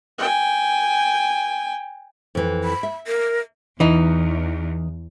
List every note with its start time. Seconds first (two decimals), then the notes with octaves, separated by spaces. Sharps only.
0.19 G5 G#5
2.35 F2 E3
2.64 B5
2.83 E5
3.07 A#4
3.80 E2 E3 D#4